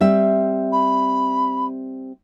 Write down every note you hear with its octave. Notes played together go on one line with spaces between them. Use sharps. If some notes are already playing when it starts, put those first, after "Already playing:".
G3 C4 E5
B5